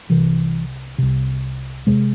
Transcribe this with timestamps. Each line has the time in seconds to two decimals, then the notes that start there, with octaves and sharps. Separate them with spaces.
0.10 C2 C3 E3
0.98 C2 C3
1.87 E2 C3 G#3